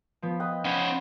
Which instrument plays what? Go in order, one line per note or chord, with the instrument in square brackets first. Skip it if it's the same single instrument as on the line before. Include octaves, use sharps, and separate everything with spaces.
[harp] F3 B3
[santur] B4 D#5 G5
[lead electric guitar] C#4 C5 [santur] F#5 [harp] B5 C6 G#6